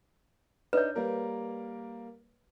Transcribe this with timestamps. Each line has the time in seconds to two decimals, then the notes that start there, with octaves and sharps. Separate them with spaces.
0.73 D4 D#4 B4 C#5
0.95 G3 A#3 A#4